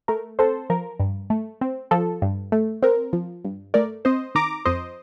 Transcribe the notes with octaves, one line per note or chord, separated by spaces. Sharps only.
A3 A#4
C4 A4 C5
F3 A#4
G2
A3
C4
F3 A4
G2
A3
C4 A#4
F3
G2
A3 A#4 D5
C4 C5 D#5
D#3 A#5 D6
F2 C5 D#5